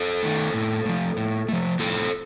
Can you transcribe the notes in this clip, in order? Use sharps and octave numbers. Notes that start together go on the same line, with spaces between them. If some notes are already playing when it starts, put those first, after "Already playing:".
Already playing: F4 A4
D#3 A3
A2
F3 A3
A2
F3 A3
A2 F4 A4